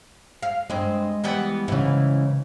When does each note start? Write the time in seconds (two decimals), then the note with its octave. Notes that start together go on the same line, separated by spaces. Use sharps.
0.43 F5
0.70 G2 G#3 C4 D#5
1.24 E3 G3 B3
1.68 G#2 C#3 E3